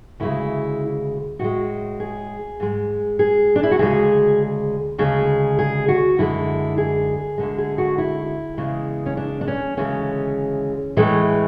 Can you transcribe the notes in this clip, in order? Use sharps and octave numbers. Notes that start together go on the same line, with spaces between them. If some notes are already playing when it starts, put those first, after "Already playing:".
D2 C#3 G#3 E4
A2 G#3 F#4
G#4
G#2 G#3
G#4
D4
E4
F#4
D2 C#3 G#3 G#4
D2 C#3 G#3 G#4
G#4
F#4
F#2 D3 G#3 E4
G#4
D2 D3 G#3
G#4
F#4
E4
E2 C#3 G#3
C#4
D4
D4
C#4
D2 C#3 E3 G#3 C#4
A2 E3 G#3 A3